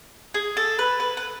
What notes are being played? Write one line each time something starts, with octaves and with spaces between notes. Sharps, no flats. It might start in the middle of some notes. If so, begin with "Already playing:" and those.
G#4
A4
B4
B4
B4